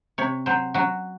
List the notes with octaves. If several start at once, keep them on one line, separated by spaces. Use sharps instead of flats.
C3 C#5
F#3 C5
F#3 F#4